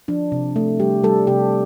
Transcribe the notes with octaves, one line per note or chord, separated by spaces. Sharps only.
F3 D4
C3
A3
G3 G4
G3 A4
C3 G4